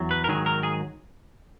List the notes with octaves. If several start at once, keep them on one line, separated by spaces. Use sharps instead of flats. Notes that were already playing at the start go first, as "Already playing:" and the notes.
Already playing: E2 F#3
B4
A#4
G#2 D#3 F#3 G#4
A#4
G#4